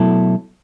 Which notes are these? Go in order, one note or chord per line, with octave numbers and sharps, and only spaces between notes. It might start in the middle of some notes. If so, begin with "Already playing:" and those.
Already playing: B2 F#3 A3 E4 A4